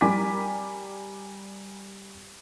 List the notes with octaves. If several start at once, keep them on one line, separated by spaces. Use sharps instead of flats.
G3 A#4 G#5 D6 B6